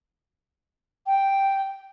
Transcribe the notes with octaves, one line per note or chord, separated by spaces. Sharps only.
G5